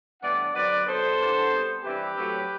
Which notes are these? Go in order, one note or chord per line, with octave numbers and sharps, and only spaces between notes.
A2 E3 G3 B3 D4 D5 F#5
D3 F#3 C4 B4 D5
B2 F#3 B3 A4 C5
G2 E3 B3 D4
C3 G3 B3
G2 E3 G3 C4 G4 B4
A2 F#3 A3 C4